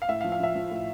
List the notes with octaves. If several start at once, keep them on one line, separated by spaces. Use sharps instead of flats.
F5
A2 E5
F5
F3
F5
F3 E5
F3
A2